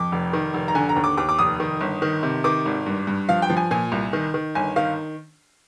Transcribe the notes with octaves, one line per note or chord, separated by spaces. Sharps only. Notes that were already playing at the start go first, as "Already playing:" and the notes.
Already playing: F2 D6
F1
D#3
F1
A#5
D3 G#5
A#5
D#2
D6
D#2 D6
D6
F1 D#6
D#3
G1
D#3
C3
D#3 D6
G#1
G2
G2
F3 F5
G5
F3
G#5
A#2 G#5
C2
D#3
D#3
G1 G#5
D#3 F5